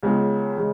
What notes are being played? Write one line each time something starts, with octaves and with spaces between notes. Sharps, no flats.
C#2 C#3 G#3 B3
C#3 G#3